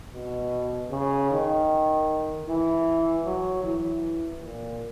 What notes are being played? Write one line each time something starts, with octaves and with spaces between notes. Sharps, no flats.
B2
C#3
D#3
E3
F#3
E3
A#2